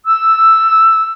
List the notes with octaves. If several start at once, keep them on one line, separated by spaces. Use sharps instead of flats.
E6